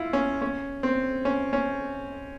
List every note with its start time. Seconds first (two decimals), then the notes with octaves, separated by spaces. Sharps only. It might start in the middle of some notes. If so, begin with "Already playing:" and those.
Already playing: E4 F4
0.13 C#4
0.42 C#4
0.83 C4
1.25 C#4
1.53 C#4